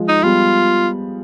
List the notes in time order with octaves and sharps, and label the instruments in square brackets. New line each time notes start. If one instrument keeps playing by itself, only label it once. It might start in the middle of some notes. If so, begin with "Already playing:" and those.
Already playing: [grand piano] F3 G#3
[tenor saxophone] D#4
[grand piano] G3 B3 [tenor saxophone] F4